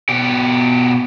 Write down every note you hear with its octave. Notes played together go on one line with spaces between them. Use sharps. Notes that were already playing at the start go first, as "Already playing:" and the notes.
B2 G4